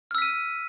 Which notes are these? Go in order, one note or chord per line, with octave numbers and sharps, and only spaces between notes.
E6 F6 B6 D#7